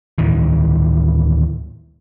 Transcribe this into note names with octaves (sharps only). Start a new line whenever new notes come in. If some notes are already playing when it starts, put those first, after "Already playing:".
D2 A2 D#3 E3